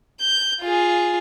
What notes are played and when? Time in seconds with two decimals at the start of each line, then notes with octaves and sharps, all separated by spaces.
0.21 G6
0.62 F4 G#4